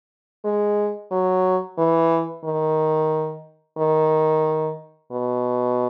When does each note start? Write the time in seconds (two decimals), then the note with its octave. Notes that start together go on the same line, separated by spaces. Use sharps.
0.44 G#3
1.11 F#3
1.78 E3
2.44 D#3
3.78 D#3
5.11 B2